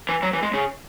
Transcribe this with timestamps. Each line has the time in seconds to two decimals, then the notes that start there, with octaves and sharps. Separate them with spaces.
0.09 E3
0.23 F#3
0.33 E3
0.43 G#3
0.53 C#3